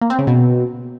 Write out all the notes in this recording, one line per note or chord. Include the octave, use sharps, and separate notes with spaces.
A#3
C4
C#3
B2